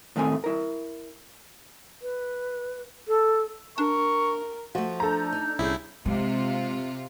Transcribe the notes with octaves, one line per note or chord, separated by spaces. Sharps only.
A2 D#3 A3 C4 E5 G#5
E4 A#4
B4
A4
D4 A#4 C#6
F3 A3 F#4
D4 A4 A#5 G6
D#4
C2 C#4 E4 G4 G#4
C3 G#3 F4